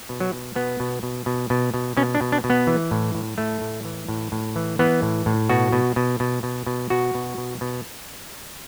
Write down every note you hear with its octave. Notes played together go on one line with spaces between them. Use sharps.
B2
F#3
B2
B2 B3
B2
B2
B2
B2
B2
B2 C#4
D4
B2
D4
B2
B3
E3
A2
A2
A2 A3
A2
E3
A2
A2
E3
E3 B3
A2
A2
B2 F#4
B2
B2
B2
B2
B2
B2 F#4
B2
B2
B2